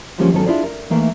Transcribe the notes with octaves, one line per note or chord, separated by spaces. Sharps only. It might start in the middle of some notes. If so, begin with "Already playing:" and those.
D3 F3 G3 G#3 A#3 C#4
G#2 D#3 F#3 B3 C#4 A4
D4 E4 F4 G#4 D5
A#4
E3 A3 A#3 D#4